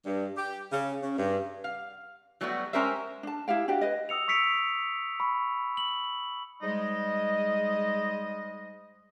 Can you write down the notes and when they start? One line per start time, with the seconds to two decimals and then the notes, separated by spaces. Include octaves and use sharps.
0.05 G2
0.36 G4
0.71 C#3
1.02 C#3
1.17 G2
1.64 F5
2.41 F#3 G3 A3 B3 F4 F#4
2.73 G#3 C#4 G4 A#4 C5 E5
3.23 D4 A5
3.48 E4 G4 F5 G5
3.68 D4 F#4 G4 D5
3.81 B4 D#5
4.09 D#6 E6 C#7 F7
4.28 C#6 E6 B6 C#7 D7 F7
5.20 B5 C#6
5.77 F#7
6.61 G#2 G3 G#3 D#5